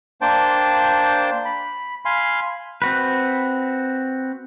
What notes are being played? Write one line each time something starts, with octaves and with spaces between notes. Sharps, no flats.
A#3 D4 C5 G5 A5
B5
F5 G#5 B5 C6
C4 F#4 B4